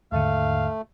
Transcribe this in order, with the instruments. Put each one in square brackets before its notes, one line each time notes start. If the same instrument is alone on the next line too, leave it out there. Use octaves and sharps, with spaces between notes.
[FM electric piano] D#2 G#2 D3 [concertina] A3 [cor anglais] F5